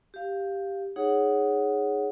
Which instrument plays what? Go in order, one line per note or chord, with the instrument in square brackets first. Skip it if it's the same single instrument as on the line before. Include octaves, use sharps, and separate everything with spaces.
[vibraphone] G4 F5
D#4 G#4 C#5 F#5